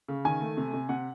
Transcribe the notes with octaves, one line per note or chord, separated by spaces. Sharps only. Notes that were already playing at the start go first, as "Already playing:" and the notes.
C#3
D#3 G#5
A3
C3
C3
C3 F#5